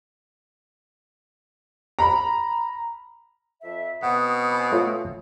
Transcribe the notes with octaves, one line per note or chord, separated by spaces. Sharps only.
A#5 B5
F2 E5
B2 C4 F#5 D#6
G#5 B5 D6
A3 F4 C#5